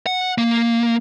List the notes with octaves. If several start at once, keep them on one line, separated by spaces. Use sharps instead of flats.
F#5
A#3